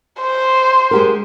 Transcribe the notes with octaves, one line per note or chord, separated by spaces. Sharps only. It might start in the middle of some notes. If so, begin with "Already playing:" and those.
C5
G#3 G4 A#4